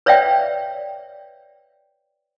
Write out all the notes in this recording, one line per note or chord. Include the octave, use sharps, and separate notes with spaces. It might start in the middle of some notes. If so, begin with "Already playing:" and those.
B4 C#5 D5 E5 F5 G5